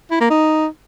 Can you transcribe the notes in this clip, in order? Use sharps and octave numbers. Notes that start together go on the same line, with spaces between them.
E4
A#3
D#4